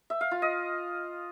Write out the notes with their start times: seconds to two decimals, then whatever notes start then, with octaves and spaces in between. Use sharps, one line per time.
0.10 E5
0.21 F5
0.31 F4
0.42 D#5